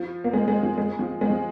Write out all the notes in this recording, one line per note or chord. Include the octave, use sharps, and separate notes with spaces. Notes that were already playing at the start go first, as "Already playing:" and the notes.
Already playing: F3
A#3
G#3
G#3
F3
G#3
F3
G#3
F3